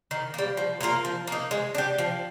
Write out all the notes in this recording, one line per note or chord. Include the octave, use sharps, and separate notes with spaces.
D#3
G3 A#3
F3
A#3 F4 A#4
F3
A#3 D#4
G#3
D4 G4
F3